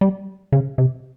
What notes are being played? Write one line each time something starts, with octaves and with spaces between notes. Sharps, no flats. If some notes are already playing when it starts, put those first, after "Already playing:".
G3
C#3
C3